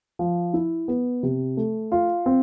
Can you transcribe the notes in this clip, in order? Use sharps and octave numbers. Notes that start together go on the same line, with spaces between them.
F3
E4
B3
C3
A3
F4
C4